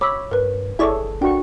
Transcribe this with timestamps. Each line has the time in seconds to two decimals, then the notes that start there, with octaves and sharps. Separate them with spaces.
0.01 C#5 B5 D6 E6
0.31 G2 A#4 B4
0.79 G1 E4 G#4 A4 C#5 D5
1.21 A1 D4 F#4 A#4 G5 C#6